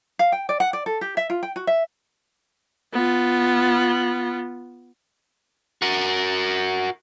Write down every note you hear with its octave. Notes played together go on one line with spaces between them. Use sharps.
F5
G5
D5
F#5
D5
A4
G4
E5
F4
G5
F#4
E5
B3 F4
F#4 A#4